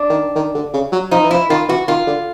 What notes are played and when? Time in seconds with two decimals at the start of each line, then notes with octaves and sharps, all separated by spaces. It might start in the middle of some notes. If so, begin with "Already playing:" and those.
Already playing: D4
0.10 D#3
0.36 D#3
0.55 D3
0.73 C#3
0.92 F#3
1.11 F3 D#4
1.24 E3
1.31 F3 E4
1.50 D#3 F4
1.69 E3 F#4
1.88 D#3 F4
2.07 D3